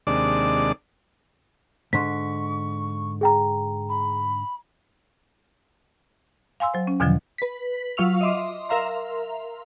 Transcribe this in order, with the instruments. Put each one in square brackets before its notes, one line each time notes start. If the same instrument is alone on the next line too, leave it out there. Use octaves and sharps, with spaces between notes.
[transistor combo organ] D#2 C3 G#3 D4 D5 D6
[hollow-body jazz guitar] G#2 D3 [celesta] C6 B6 [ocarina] C#6
[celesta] G#4 G5 A#5
[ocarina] B5
[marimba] F5 G#5 C6 E6
F#3 C5
C#4
E2 B2 D3 D#3 F3 F#3
[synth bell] B4 B6
F#3 F4 F5 C#6 E6 F7
D#5 E5 C6 D6
A#4 E5 F5 A#5 C6